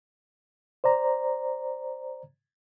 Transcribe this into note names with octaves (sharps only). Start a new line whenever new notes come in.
C5 D5 A#5